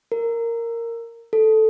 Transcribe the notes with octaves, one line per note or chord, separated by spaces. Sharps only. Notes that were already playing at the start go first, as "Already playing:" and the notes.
A#4
A4